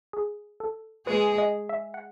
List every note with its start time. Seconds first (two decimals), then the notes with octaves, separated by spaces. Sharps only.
0.13 G#4
0.60 A4
1.07 G#3 G#4 B4
1.38 D#5
1.69 E5
1.94 F#5